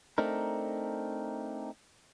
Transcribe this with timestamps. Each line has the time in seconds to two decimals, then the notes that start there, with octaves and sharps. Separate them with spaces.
0.18 A3 C4 D4 D#4 A#4